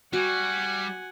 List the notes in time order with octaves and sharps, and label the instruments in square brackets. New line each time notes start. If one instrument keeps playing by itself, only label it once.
[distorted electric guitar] G3 [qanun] F#4 [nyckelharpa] F#5 G#5